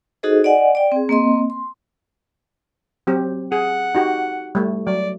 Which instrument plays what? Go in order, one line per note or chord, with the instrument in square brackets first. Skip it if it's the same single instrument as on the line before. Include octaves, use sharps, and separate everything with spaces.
[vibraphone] D#4 F#4 G#4 A4 C5 D#5
D5 D#5 F#5 G#5
D5 G5
C4 G#4
A#3 C4 D#5 C6
C6
[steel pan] F#3 C4 G4
[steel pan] G#4 [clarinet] F#5
[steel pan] D#4 F#4 G4
G3 A3
[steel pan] F#3 [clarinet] D5